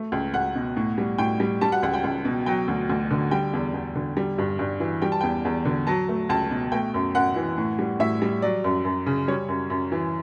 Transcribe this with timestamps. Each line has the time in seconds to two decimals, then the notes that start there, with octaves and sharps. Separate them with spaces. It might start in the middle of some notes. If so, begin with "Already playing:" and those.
Already playing: A3
0.12 C#2
0.34 C#2 F#5
0.56 B2
0.77 A2
0.98 G3
1.18 A2 G5
1.40 G3
1.61 G3 A5
1.72 F#5
1.83 C#2 F#5
1.94 G5
2.04 C#2
2.25 B2
2.46 F#3 G5
2.68 D2
2.89 D2
3.11 D3
3.31 G3 G5
3.53 E2
3.74 E2
3.96 D3
4.17 G3
4.38 G2
4.59 G2
4.80 E3
5.02 G3 G5
5.12 A5
5.21 E2 G5
5.45 E2
5.65 D3
5.87 F#3 A5
6.09 A3
6.29 C#2 A5
6.51 B2
6.72 A3 G5
6.94 F#2
7.15 F#2 F#5
7.36 E3
7.58 A2
7.79 G3
8.00 A2 E5
8.22 G3
8.42 F#3 D5
8.64 F#2
8.85 F#2
9.06 C#3
9.28 G3 C#5
9.48 F#2
9.70 F#2
9.92 E3